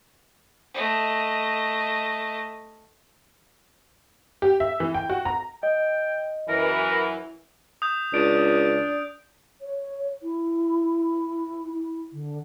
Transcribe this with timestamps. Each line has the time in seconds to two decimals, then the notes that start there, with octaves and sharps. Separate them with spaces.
0.74 A3 D#5
4.42 G4
4.60 E5
4.80 E3
4.94 G5
5.10 F#4
5.25 A#5
5.63 D#5 G5
6.49 F#2 E3 A#4
7.82 D#6 G6
8.14 C#2 D4 D7
9.61 C#5
10.23 E4
11.74 E4
12.13 D3